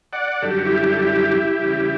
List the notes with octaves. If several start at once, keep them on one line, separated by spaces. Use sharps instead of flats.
D5 F#5
F#2 D3 G3 A4
G4
F#4
E4 G4
A4
E4 G4
E2 C#3 G3